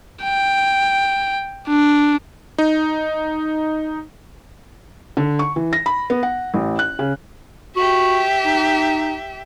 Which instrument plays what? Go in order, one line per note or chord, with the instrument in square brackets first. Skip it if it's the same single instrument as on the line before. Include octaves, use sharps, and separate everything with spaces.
[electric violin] G5
D4
[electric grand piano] D#4
[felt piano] D3
C#6
E3
A#6
B5
B3
F#5
A1
F#6
C#3
[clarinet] F#4 [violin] G4 E5
[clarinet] D#4